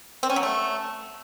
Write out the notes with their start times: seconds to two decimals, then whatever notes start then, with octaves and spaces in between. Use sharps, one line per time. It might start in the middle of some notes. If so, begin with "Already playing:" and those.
0.23 C4
0.30 C#4
0.36 F#3
0.43 A3